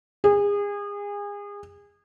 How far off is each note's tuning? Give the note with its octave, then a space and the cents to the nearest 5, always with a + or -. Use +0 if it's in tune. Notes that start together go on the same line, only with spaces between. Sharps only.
G#4 -30